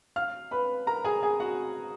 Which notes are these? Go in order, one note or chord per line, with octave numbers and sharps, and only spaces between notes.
F5 F6
B4 B5
A#4 A#5
G#4 G#5
G#4 G#5
F#4 F#5